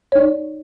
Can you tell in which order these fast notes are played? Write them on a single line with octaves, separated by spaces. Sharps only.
C#5 D#4 D5